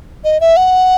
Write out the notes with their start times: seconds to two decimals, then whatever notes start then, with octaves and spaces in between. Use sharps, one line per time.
0.24 D#5
0.41 E5
0.57 F#5